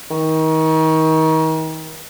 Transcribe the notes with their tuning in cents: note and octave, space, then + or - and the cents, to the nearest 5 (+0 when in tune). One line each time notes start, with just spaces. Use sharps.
D#3 +35